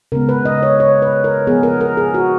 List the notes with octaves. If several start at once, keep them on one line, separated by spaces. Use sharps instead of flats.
C#3 G#3 B3 A#4
B4
D#5
C#5
C#5
B4
A#4
F3 B3 G#4
A#4
A#4
G#4
F#4